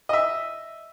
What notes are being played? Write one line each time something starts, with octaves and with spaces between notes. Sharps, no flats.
D#5 E5